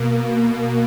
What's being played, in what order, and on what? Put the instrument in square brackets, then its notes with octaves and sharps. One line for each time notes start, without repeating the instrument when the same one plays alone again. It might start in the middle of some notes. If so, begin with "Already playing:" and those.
Already playing: [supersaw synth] B2 A#3